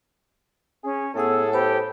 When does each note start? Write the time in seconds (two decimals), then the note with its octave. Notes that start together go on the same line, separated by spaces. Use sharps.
0.84 C#4 G#4
1.15 A2 B3 G#4 A4 F#5 E6
1.52 G4 B4 C5 B5